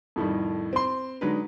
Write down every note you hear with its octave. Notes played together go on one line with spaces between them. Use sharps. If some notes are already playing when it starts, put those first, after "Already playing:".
F2 A2 D#3 G3
C4 C6
D3 F#3 G#3 D4 D#4 B4